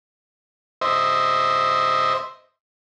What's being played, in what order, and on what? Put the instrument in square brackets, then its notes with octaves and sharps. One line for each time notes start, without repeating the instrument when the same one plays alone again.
[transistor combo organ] C5 D#5 E5